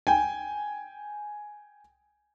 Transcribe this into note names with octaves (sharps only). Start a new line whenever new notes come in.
G5 G#5